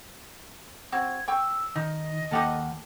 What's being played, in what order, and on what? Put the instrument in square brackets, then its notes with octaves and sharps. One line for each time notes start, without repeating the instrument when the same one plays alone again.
[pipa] C4 F#4 [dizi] G#6
[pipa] G5 C#6 [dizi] E6
[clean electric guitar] D#3 [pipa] D#4 [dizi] D#5
[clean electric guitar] D#2 A#3 F#5 [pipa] D#4 G4 A4